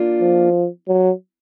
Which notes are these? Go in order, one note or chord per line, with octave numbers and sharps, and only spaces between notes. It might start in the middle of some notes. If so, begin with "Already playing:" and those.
Already playing: A#3 D4 F4
F3
F#3